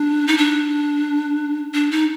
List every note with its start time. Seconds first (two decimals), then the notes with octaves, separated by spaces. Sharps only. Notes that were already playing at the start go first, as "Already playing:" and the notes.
Already playing: D4
0.27 D#4
0.38 D4
1.74 D4
1.91 D#4